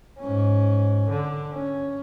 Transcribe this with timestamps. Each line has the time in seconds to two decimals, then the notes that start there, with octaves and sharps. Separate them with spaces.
0.20 G#2 C#4
1.10 D3
1.52 C#4